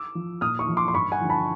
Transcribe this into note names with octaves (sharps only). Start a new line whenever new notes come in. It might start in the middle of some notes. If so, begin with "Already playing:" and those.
Already playing: D6 E6
F3
A#2 D#6 F6
C#6 D#6
F3
C6 D6
C6
G2 B5 C#6
F#5 G#5
D3 F3
A5 B5